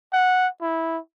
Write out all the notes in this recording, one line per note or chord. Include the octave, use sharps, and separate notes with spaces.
F#5
E4